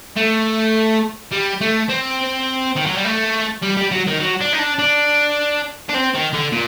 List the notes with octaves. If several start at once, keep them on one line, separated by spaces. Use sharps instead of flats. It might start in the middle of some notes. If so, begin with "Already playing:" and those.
A3
G3
A3
C4
D#3
F#3
G3
A3
G3
G3
F#3
D#3
F#3
D4
D#4
D4
D4
D4
C4
D#3
D3
A#2